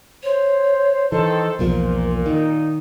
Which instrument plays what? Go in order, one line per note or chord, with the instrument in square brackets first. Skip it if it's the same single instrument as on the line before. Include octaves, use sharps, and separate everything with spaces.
[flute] C5 [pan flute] C#5
[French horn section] D#3 A4 [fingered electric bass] E3 [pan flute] D#5
[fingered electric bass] B1 E2 F3 [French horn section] A#2 [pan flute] A#4
[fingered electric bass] D#3 [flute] D#4